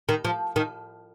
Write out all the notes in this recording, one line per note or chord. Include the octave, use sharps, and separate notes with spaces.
D#3
F3
D#3